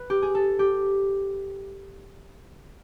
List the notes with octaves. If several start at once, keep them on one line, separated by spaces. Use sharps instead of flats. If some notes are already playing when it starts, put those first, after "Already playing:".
Already playing: B4
G4
G#4
A4
G4